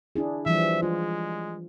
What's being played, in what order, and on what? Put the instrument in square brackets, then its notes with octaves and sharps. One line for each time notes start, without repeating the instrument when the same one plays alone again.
[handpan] D4 E4 G#4
[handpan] E3 F3 G3 [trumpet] E5
[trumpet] G#3 [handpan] F4